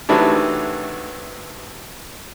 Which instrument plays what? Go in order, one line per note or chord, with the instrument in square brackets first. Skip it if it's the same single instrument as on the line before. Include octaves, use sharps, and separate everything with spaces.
[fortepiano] C3 D#3 E3 F#3 A3 D4